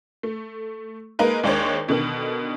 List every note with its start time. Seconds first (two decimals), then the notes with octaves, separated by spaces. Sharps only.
0.23 A3
1.19 G#3 A#3 D#4 A#4 B4
1.43 D#2 G#3 D4 C5 C#5
1.88 B2 D3 D#3